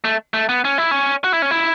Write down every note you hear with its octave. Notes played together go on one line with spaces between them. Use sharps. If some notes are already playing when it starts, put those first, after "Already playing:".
A3
A3
B3
C#4
E4
C#4
F#4
E4
C#4
E4